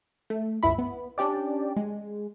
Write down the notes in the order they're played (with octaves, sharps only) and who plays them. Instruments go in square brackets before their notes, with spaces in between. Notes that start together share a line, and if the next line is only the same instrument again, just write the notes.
[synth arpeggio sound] A3
G1 C#2 E4 B5
B3
C#4 D4 G4 D5
G#3